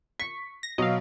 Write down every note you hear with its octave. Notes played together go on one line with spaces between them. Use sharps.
C#6 B6
A#6
B2 F#3 D#5 F5